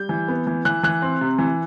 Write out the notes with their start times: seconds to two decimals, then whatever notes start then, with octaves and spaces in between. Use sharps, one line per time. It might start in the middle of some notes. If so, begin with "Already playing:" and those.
Already playing: G3 G6
0.09 E3
0.28 B3
0.47 E3
0.65 E3 F#6
0.83 E3 F#6
1.02 C4
1.21 C3
1.38 E3